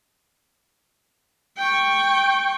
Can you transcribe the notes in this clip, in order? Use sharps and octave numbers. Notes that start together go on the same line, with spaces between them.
G5 C#6